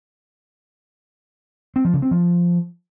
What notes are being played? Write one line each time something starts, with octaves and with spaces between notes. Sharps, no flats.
C4
F3
C#3
C4
F3